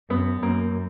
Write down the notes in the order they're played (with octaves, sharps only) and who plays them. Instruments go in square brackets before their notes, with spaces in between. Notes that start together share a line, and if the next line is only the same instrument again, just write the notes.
[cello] F#2 [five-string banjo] B3
[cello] F#2 [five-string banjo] A#3